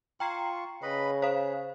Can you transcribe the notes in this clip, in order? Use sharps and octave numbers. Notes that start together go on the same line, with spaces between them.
F4 G5 A#5 C#6 C7
C#3 B4 D#5 B5
G#4 C5 F5